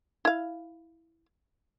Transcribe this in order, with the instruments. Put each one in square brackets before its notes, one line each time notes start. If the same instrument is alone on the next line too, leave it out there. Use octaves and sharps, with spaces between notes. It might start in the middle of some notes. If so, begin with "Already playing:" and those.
[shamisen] E4 F5